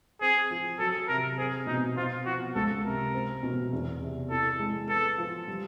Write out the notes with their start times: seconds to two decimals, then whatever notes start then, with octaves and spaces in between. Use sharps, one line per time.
0.21 C4 G#4
0.51 F3
0.79 F#3 A4
1.08 C3 A#4
1.38 C4 G#4
1.67 B2 D#4
1.96 C4 F4
2.26 F3 F#4
2.55 C#2 A4
2.84 C3 A#4
3.14 C4
3.43 B2
3.73 E2
4.01 C3
4.30 E4 A4
4.59 G#3
4.89 B3 A4
5.18 F3
5.48 G3